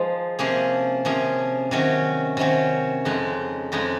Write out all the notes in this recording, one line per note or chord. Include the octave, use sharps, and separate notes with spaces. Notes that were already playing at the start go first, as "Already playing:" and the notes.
Already playing: F3 G#3 D#4
C3 F3 A#3 C#4 G#4
C3 F3 A#3 C#4 G#4
C3 D#3 F#3 C#4
C3 D#3 F#3 C#4
F2 C#3 G#3 D#4
F2 C#3 G#3 D#4